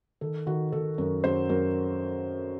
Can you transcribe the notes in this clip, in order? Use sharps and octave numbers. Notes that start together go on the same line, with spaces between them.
D#3 A4
D#3 F#4
D#3 A4
F#2 A#4
F#2 C5
F#2 A#4